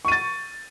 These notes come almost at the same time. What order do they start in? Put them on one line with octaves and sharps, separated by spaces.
C#6 D#7 A6